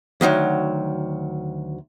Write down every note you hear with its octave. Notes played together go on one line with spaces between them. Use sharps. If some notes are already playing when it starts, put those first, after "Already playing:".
D2 D#3 F3 F#3